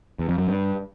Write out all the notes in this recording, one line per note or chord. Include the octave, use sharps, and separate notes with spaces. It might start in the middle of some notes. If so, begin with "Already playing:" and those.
E2
F2
F#2
G2